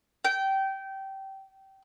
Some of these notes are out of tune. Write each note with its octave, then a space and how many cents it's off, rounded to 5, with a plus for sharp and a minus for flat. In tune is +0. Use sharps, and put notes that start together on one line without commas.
G5 -20